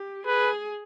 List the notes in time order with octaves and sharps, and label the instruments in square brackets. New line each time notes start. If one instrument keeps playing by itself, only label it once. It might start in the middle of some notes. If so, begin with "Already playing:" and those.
Already playing: [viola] G4
[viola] G#4 [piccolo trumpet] B4